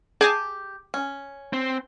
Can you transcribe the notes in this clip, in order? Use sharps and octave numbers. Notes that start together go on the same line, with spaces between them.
G4 G#4 G#5 A5
C#4
C4